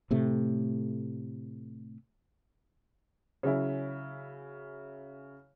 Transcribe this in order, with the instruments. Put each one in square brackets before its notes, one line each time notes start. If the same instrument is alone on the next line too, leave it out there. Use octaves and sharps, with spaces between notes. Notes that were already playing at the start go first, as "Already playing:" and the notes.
[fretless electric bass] A2 C3 A3
[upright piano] C#3 F#3 C#4 E4